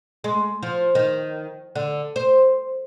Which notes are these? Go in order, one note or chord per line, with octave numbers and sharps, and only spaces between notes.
G#3
F3
D#3
D3
C5